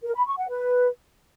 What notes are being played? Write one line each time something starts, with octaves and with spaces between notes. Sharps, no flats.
A#4
B5
C#6
F#5
B4